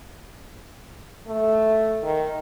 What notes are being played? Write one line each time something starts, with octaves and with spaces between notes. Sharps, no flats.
A3
D#3